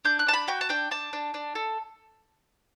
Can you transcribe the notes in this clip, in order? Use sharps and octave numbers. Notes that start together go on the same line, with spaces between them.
D4 G6
F#6
D4 A5
B5
F#4 G5
A5
D4 G5
D4 A5
D4
D4
A4